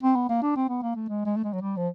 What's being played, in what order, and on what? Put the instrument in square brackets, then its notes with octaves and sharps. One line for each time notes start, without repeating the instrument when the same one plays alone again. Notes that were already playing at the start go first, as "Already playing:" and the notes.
[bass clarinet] C4
B3
A#3
D4
C4
B3
A#3
A3
G#3
G#3
A3
G#3
F#3
G3
F3